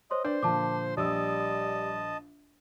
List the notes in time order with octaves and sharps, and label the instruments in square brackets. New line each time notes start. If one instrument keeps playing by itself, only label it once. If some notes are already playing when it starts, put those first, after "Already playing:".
[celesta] C5 C#5 C6 [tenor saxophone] D#5
[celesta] D4 B4 [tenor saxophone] C5 [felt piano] D5
[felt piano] A#2 D3 F3 [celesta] A5 D6
[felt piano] A#1 [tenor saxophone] G3 [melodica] D#5 A5 [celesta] D#6 E6